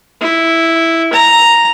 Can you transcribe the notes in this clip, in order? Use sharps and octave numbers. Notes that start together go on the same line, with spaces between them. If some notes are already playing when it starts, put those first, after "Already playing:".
E4
A#5